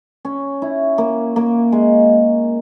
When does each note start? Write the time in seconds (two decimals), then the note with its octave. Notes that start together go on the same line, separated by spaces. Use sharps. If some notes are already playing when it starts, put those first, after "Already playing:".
0.25 C#4
0.62 E4
0.98 A#3
1.36 A#3
1.72 G#3